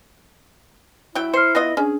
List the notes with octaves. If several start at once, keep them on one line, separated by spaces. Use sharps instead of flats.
F#3 E4 G5
C5 F6 C7 C#7
B3 F4 D#5 A#6
C#4 D4 G#4